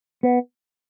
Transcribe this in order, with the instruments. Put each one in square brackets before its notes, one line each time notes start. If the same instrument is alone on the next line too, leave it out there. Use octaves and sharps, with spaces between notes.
[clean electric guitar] B3